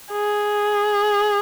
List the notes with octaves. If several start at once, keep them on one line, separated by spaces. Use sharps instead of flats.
G#4